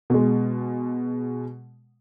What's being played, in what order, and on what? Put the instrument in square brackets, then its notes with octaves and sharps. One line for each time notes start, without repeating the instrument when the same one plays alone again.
[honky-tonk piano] B2 G#3